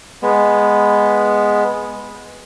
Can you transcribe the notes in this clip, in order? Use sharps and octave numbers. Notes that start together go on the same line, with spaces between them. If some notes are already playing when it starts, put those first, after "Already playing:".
G#3 B3